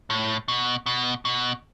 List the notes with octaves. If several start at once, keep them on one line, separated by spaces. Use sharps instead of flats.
A2
B2
B2
B2